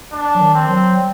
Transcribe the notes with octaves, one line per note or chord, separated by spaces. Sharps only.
D4
F#3
D#3
C4
F#3
G3